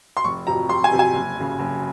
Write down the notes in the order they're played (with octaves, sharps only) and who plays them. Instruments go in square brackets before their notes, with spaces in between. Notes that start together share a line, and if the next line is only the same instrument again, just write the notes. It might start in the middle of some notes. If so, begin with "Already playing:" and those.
[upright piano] C6
F1 C#6
F2 C3 F#3 A#5
F1 C6
G#5
F2 C3 F#3
G#5
F#1
F#2 C#3
F#1